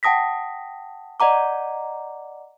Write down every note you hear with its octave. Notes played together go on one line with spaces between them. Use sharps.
F#5 G5 A5 D#6 A#6 B6
D5 D#5 F#5 A#5 D6